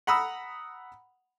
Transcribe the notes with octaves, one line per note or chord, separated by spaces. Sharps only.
F#5 A#5 B5 D#6 E6